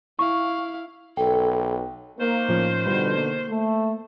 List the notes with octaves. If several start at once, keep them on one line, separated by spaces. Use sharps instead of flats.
E4 F5 C#6
B1 A4 G5
D#3 A#3 C5
A2 F3 C#4
B2 D3 G3 F4 B4
A#3
A3